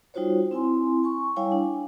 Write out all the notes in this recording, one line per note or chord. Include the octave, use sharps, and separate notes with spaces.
G3 D#4 F4 F#4 C5 C#5
C4 E4 G#5 C6
G#5 C#6
G3 E4 C#5 F5 G5 G#5
D4